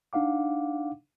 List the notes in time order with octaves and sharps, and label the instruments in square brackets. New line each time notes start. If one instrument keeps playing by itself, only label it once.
[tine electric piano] D4 D#4 F5 F#5 D6